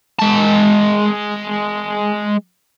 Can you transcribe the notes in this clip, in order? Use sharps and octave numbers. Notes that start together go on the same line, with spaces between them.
G#3 A5